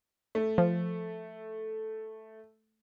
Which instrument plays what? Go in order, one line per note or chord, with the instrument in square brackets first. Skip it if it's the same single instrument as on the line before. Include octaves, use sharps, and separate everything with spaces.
[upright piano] A3
[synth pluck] F3